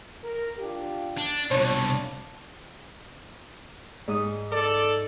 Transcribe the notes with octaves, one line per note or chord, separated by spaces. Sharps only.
A#4
D4 F4 G4
D4
C2 B2 F3 D4 C#5
G#2 D#6
A4 D5